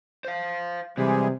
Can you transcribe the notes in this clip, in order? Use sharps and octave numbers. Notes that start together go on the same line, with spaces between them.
C5 F5
C3 E3 G3 G#3 G#4